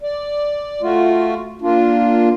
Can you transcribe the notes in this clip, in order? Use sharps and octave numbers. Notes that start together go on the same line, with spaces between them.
D5
A3 F4 F#4
A#3 D4 F4